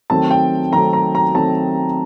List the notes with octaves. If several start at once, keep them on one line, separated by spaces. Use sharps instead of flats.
D#3 F#3 A3 C4 A5
G5
D#3 F#3 A3 C4 A#5
A#5
A#5
D#3 F#3 A3 C4 A5